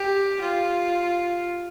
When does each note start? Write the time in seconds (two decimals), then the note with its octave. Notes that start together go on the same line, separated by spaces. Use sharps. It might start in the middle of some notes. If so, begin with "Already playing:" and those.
Already playing: G4
0.42 F4